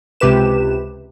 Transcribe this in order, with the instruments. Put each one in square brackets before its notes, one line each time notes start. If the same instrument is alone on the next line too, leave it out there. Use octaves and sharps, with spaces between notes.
[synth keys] C#2 C3 G4 B4 E7